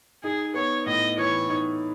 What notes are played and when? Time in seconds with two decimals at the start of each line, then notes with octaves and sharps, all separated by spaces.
0.23 D#4 G#4
0.54 B3 C#5
0.86 A2 D#5
1.17 E3 C#5
1.49 D#4